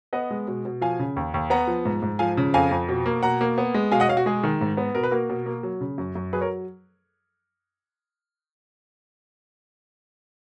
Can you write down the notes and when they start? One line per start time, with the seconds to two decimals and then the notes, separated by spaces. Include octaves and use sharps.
0.13 B3 D#5 F#5
0.31 G#3
0.47 B2
0.65 B2
0.81 F3 F5 G#5
0.99 C#3
1.16 D#2
1.34 D#2
1.50 B3 F#5 A#5
1.67 F3
1.85 G#2
2.02 G#2
2.19 F3 F5 G#5
2.37 C#3
2.54 F2 F5 G#5
2.71 F2
2.89 B2
3.06 A#3
3.23 B2 F#5 A#5
3.41 A#3
3.58 B3
3.74 G#3
3.91 B2 F5 G#5
4.00 D#5 F#5
4.08 B2 C#5 F5
4.17 F#4
4.26 G#3 G#4
4.44 D#3
4.61 G#2
4.77 B3
4.95 B2 A#4
5.03 B4
5.11 A#3 F#4 A#4
5.29 B2
5.46 A#3
5.63 F#3
5.81 C#3
5.98 F#2
6.15 F#2
6.33 F#3 G#4 B4
6.41 A#4 C#5